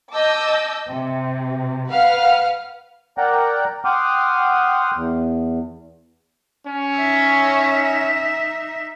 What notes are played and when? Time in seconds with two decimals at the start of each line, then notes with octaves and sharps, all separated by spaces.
0.11 D#5 A5 D6 E6 G6
0.88 C3
1.91 B4 F5 F#5 F6
3.18 A#4 D5 F#5 G5 A#5
3.85 F#5 G5 C6 D6 D#6 F6
4.95 E2
6.67 C#4
6.96 D#4 E5